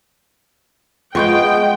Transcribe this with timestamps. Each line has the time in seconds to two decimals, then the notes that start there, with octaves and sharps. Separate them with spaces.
1.15 G#3 B3 F4 G5 C#6 G6